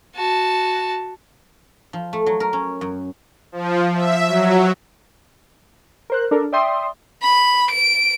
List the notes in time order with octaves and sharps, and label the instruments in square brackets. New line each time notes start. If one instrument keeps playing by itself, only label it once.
[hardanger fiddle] F#4 A5
[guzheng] F3
A3
F#3
A#4
C#4
F#2
[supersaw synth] F3
E5
F#3
[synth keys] A#4 C5 F#6
D4 A4 A#4
D5 E5 G5 C6 D#6
[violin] B5
D7